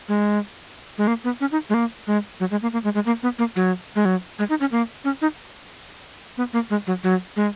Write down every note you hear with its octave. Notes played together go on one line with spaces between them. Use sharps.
G#3
G#3
A#3
B3
C#4
D#4
G#3
A#3
G#3
F#3
G#3
A#3
A#3
G#3
G#3
A#3
B3
A#3
F#3
G#3
F#3
G#3
D#4
C#4
A#3
C#4
D#4
B3
A#3
G#3
F#3
F#3
G#3